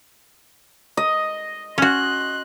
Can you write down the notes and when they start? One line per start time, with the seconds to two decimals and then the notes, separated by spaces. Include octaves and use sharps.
0.97 D#5
1.78 C#4 F#4 C6 F#6